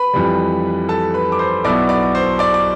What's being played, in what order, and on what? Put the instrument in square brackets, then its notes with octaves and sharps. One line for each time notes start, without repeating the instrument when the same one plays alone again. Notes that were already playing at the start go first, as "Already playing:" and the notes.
Already playing: [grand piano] B4 B5
F2 E3 G3
A4 A5
B4 B5
D6
C5 C6
B1 B2 B3 E4 D5 D6
D5 D6
C5 C6
D5 D6
D6